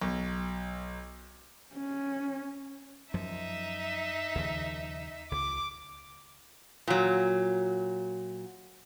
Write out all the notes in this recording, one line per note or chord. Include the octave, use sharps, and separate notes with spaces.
B1
C#4
F#2 F3 D#4 E5
D#2 C#3 F3
C#2 D6
A#2 F#3